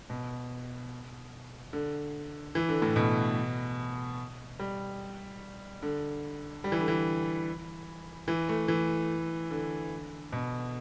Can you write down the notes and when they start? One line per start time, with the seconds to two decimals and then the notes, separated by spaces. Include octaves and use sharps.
0.10 B2
1.73 D3
2.55 E3
2.69 D3
2.82 A2
2.96 B2
4.60 G3
5.83 D3
6.64 G3
6.72 E3
6.80 D3
6.88 E3
8.28 E3
8.49 A3
8.68 E3
9.51 D3
10.33 B2